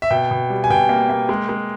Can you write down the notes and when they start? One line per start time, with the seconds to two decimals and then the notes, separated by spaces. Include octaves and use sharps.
0.02 E5
0.11 B2 G5
0.31 B2
0.50 G3
0.64 G#5
0.70 B2 G5
0.89 A#3
1.10 A#3
1.29 G#3
1.49 G#3